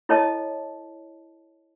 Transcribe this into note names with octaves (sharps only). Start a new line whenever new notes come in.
E4 A4 C#5 D#5 A5